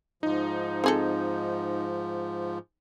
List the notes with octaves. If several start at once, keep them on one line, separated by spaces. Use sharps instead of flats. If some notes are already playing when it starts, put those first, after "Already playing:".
G#2 F3 D#4
C4 G#4 A4